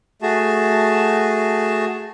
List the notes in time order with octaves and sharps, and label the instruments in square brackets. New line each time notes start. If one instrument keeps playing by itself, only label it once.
[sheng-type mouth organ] A3 F#4 G#4 A5